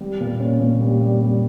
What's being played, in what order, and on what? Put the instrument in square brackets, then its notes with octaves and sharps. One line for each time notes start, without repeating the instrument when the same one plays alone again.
[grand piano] G3
A#2
C#4
A#2
G3
G3
G3